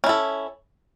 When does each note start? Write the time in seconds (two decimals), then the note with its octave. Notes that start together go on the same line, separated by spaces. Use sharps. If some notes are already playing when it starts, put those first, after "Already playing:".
0.04 C#4
0.06 E4
0.09 A4